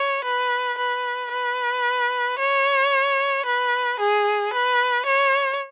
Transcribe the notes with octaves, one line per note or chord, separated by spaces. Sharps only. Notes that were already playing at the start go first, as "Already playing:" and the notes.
Already playing: C#5
B4
B4
B4
C#5
B4
G#4
B4
C#5